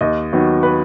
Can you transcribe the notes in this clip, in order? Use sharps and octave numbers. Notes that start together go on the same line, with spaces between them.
D#2 D#5
D#3 F#3 B3
B4